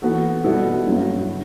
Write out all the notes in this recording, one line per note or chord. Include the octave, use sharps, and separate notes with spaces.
E3 B3 F#4 A4
B2 G3 B3 E4 A4
G2 F#3 C#4 E4
C#3